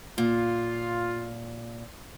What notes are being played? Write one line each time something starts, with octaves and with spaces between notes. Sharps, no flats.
A#2 F4